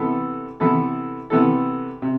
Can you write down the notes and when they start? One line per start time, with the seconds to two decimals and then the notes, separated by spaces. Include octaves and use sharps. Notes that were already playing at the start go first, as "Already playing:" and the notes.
Already playing: C3 E3 B3 E4 A4
0.60 C3 E3 B3 E4 A4
1.30 C3 E3 B3 E4 A4
2.02 C3